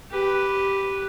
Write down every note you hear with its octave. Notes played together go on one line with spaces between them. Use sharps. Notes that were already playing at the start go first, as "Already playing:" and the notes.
G4 B4